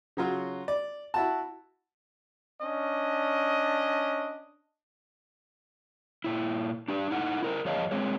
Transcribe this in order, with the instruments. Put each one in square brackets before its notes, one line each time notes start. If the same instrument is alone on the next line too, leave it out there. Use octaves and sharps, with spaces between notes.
[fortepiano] C#3 F#3 F4 F#4
D5
E4 F#4 A5
[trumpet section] C#4 D4 D#5
[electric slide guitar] A#2 E4
D4 G4 D5
D#4 E4 A4 F#5
E4 A#4 C5
F2 G#4 C#5 D#5 F5 A5
G#3 C4 G#4 C#5